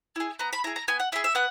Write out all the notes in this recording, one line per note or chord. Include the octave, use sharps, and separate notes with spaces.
E4 G#4
B3 A#5
B5
E4 G#4 A#5
A#5
B3 G#5
F#5
E4 G#4 E5
E5
B3 F#5